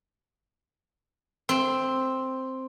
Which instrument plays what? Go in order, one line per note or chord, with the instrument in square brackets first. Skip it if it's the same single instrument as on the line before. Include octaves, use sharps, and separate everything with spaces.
[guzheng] C4